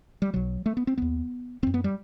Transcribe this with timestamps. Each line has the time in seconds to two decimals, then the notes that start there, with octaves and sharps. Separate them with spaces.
0.22 G3
0.33 B1 B2 F#3
0.66 A3
0.77 B3
0.87 C4
0.97 E1 B3
1.02 D#2
1.63 F#1 F#2 C4
1.74 B3
1.84 G3